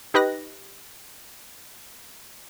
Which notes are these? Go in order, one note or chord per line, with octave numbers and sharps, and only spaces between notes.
D#4 G4 B4 D#5 F#6 A#6